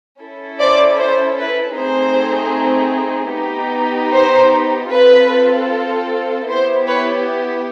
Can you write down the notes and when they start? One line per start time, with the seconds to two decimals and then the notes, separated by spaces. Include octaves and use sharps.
0.21 C#4 E4 A4
0.60 C5 D5
0.99 C5
1.39 B4
1.78 A3 C4 D#4 G#4 C5
3.34 B3 D#4 G4
4.13 C5
4.91 C4 F4 A4 B4
6.48 B3 E4 G4 C5
6.87 B4 C#5